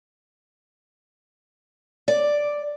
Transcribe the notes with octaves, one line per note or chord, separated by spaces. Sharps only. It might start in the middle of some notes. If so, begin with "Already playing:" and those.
D5